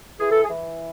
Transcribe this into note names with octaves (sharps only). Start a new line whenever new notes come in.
E3 G#4
A4
G#4
E3